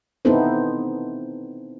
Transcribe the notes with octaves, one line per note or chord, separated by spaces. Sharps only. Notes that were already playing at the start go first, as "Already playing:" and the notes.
B3 C4 D#4 E4 A4 C5